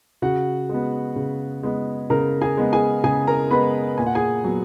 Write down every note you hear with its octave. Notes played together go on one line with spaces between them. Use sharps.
C#3 F#4 F#5
G#3 B3
C#3
G#3 B3
C#3 A#4 A#5
G#4 G#5
G#3 B3
G#4 G#5
C#3 G#4 G#5
A#4 A#5
G#3 B3 B4 B5
A#2 G#5
F#5
G#4 G#5
F#3 B3